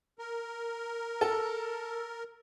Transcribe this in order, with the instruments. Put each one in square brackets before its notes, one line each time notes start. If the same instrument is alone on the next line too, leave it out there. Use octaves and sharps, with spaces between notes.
[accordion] A#4
[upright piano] A4